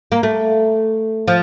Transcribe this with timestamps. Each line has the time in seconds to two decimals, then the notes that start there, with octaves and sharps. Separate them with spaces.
0.12 A#3
0.23 A3
1.28 F3